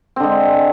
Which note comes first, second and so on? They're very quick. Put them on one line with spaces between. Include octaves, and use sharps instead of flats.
C4 D3 G#3